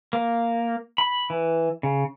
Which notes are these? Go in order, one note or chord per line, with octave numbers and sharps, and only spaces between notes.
A#3
B5
E3
C#3